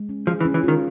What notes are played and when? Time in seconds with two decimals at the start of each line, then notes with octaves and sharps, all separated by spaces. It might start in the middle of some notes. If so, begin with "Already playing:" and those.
Already playing: G#3
0.09 C#4
0.27 F3 G#4
0.40 E3
0.45 C#4
0.54 E3
0.64 D#3 F4